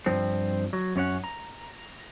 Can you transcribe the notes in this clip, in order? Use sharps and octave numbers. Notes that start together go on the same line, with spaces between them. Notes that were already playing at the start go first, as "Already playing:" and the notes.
G2 F3 C4
F#3
F#2 C#4 C#5 F#5
A#5